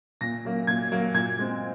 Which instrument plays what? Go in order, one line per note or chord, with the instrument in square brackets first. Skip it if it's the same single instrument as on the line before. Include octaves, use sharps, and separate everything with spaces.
[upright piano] A#2 A#6
F#3 A#3
A#2 G#6
F#3 A#3
A#2 G#6
G#3 C4